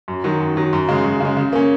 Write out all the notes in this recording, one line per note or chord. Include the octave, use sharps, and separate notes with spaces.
F#2
D#3 F#3
F#2
D#3 F#3
F#2
C#3 G#3
F#2
C#3 G#3
C#3
A#3 C#4